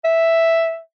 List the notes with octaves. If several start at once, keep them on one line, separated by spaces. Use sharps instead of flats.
E5